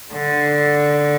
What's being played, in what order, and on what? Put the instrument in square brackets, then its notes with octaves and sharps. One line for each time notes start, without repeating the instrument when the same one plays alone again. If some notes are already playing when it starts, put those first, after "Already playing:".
[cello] D3